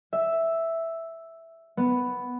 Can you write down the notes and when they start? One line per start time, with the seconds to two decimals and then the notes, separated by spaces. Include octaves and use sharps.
0.13 E5
1.77 B3